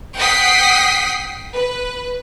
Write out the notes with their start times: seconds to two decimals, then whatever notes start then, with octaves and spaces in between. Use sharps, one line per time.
0.19 F#5 G5 D#6 B6 C7
1.55 B4